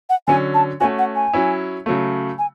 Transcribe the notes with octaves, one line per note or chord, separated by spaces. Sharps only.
F#5
D3 F#3 C#4 G#5
A5
A3 C#4 F#4 G#5
F#5
G#5
F#3 C#4 E4
C#3 F#3 A3
G#5